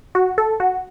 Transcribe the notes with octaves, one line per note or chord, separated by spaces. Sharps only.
F#4
A4
F#4